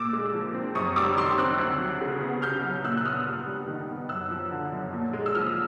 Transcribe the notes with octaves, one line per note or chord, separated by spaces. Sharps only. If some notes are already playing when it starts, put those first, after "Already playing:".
Already playing: A#2 A#3 D6 E6
G#3
F3
C4
F#2 C#6 D#6
G3 D6 E6
D#3 C6 D6
C4 E6 F#6
D2
F#3
C#3
B3
C2 F6 G6
F#3
A#2 E6 F#6
F#6
B3 D#6 F6
G2
G3
D#3
B3
F#2 E6 F#6
F3
D3
F#2
A#2
G#3
E6
F3 D#6 F6